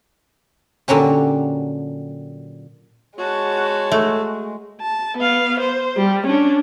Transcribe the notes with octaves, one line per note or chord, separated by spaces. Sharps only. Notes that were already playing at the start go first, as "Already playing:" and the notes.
A#2 D3 F#3 C#4 G4
G#3 F#4 C#5 A5
A3
A5
B3 F5
C5
G3
C#4 D4